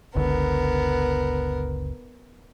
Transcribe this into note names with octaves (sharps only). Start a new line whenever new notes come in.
F#1 C#2 D3 B3 A#4